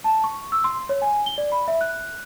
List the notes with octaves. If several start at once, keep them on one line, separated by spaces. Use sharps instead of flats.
A5
C#6
E6
C6
C#5
G#5
G7
D5
B5
E5
F#6